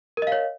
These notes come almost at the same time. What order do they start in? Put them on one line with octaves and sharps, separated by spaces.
A#4 D#5 F5 C#5